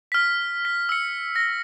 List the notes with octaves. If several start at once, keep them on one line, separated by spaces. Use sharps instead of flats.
F6 B6
B6
E6 C#7
A#6